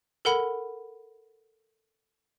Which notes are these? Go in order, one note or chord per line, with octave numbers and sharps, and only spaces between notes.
A4 A#4 F#5 B5